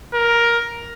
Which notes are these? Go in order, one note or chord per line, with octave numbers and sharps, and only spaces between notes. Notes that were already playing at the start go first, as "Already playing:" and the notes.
A#4